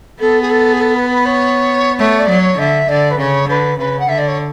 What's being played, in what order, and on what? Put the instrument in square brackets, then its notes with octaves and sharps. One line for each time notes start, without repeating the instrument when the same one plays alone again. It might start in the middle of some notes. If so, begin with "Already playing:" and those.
[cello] B3 [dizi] A4
[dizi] G#4
A4
G#4
A4
B4
B4
C#5
[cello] A3 [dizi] C#5
[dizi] D5
[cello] F#3
[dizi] C#5
[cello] D3 [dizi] E5
[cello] D3 [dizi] D5
[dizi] B4
[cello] C#3 [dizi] C#5
[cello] D3 [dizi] B4
[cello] C#3 [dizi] B4
[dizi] F#5
[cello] D3 [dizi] E5
[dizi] D5
C#5